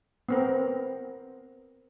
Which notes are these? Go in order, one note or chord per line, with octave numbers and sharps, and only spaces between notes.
B3 C4 A#4